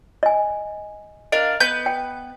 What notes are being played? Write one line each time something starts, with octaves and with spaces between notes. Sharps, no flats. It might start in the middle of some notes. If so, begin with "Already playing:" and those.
D#5 G#5
D4 A#4 D#5 F5
B3 B4 G6
G5